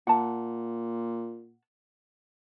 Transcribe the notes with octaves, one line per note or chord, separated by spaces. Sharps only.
A#2 F#5 A5